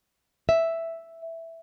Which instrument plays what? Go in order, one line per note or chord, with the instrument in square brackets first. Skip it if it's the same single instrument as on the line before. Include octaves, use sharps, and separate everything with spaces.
[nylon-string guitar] E5